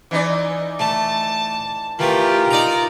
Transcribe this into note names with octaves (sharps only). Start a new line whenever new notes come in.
E3 D#4 D5
A3 A5
E3 A3 F4 G4 A#4
D#4 D5 A#5